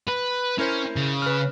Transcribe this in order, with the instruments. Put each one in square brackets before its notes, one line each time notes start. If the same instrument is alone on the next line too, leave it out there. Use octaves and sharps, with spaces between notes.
[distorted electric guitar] B4
[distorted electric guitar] C#4 [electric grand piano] E4 A#4 C5
[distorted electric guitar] C#3
[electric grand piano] B4 F6